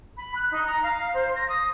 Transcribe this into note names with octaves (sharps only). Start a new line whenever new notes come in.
B5
F#6
D#4
A#5
F5
C5
A#6
D#6